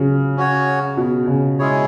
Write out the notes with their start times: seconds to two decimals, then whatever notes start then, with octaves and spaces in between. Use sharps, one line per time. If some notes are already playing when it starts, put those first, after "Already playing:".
Already playing: C#3 F#3
0.37 C#4 F#4 C#5
0.97 B2
1.28 C#3
1.59 G#3 C#4 E4 G#4 C#5